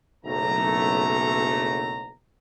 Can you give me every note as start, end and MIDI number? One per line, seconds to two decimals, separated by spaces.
0.24 2.10 30
0.24 2.10 35
0.24 2.10 57
0.24 2.10 82